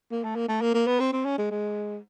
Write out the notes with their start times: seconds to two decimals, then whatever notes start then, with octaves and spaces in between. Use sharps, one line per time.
0.11 A#3
0.24 A3
0.36 A#3
0.49 A3
0.62 A#3
0.74 A#3
0.87 B3
1.00 C4
1.13 C4
1.25 C#4
1.38 G#3
1.51 G#3